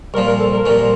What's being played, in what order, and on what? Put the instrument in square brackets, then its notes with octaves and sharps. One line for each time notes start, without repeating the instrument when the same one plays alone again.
[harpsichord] C2 A#2 F3 [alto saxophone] A#4
[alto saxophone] A#4
A4
A#4
[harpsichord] C2 A#2 F3